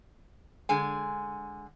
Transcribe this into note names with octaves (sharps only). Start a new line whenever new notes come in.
D3 G#3 G#4 G#5